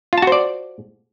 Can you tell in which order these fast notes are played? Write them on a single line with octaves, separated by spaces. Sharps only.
F4 A5 F#4 C5 D5